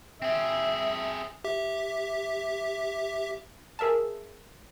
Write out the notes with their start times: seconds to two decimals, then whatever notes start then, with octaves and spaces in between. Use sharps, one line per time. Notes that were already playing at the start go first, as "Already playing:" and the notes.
0.22 C4 G#4 E5
1.44 G4 E5
3.79 G#4 A#4 E5 F5 A5